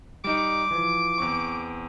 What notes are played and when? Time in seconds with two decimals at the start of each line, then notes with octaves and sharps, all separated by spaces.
0.24 G3 D#4 D6
0.71 E3 F3
1.18 E2 C4 C#6